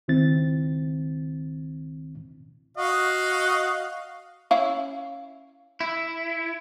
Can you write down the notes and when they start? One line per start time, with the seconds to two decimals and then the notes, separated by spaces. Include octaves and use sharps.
0.08 C#2 D#3 C4 E4 A6
2.77 F#4 D#5 F5
4.51 C#4 E4 F5
5.81 E4